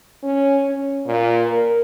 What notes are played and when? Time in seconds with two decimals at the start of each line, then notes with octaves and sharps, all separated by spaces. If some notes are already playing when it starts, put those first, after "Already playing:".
0.23 C#4
0.65 C#4
1.06 A#2
1.47 A#4